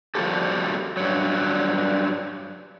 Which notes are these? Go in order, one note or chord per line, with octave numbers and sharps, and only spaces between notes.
F3 G3 A#3 F#4 G4 A4
G2 F#3